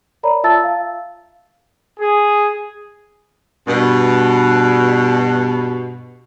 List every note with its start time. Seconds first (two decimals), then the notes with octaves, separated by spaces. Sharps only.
0.23 A#4 C#5 D5 A#5 B5
0.44 F4 E5 A5 E6 A6
0.64 F5
1.98 G#4
3.68 G2 B2